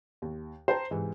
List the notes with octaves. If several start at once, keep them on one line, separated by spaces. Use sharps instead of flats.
D#2
C5 G5 A5 A#5
G#2 C3 E3 C4